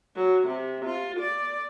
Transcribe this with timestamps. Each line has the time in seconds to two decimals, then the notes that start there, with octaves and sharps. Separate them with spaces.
0.15 F#3
0.46 C3
0.84 F4
1.19 D5